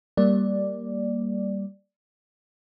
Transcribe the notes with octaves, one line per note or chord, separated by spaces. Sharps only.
G3 A#3 D5